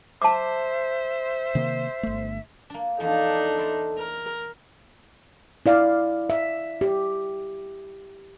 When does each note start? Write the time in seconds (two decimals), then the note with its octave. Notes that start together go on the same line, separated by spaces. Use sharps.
0.22 C5 E5 A5 D6
1.55 C3 D#3 A#3
2.03 G1 A3
2.70 A#3 D4
3.00 E2 F3 A#3 D4 D#4 A4
3.57 E4 C5 D5
3.98 A#4
5.66 E4 D5 F5
6.30 E5
6.81 G4